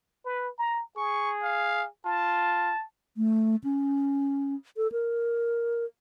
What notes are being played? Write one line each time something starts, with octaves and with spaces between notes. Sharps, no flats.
B4
A#5
G#4 C#6
F5
F4 A5
A3
C#4
A4
A#4